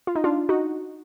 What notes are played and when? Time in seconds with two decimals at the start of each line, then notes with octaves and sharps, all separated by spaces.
0.07 F4
0.15 D#4
0.24 D4 F4
0.49 D#4 F#4